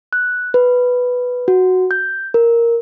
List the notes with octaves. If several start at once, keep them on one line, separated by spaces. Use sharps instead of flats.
F#6
B4
F#4
G6
A#4